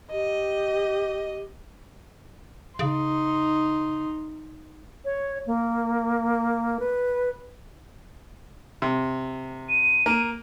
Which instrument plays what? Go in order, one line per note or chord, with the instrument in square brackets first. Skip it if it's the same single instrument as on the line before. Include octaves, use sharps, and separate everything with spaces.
[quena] G4 [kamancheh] D#5
[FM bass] C#3 [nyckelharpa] D#4 C6
[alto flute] C#5
A#3
B4
[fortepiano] C3
[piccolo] D#7
[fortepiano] A#3